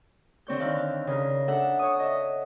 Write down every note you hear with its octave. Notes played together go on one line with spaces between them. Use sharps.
D3 C4 C#5 G6
D3 D#3 F5 E6 F#6
C#3 A#4
D4 A4 E5 F#5
C#5 D#6
D#5 E5